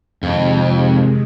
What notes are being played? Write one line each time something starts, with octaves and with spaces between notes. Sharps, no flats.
F2 C3 D#3 G#3